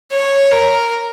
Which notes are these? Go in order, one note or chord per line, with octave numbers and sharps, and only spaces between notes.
C#5
A#4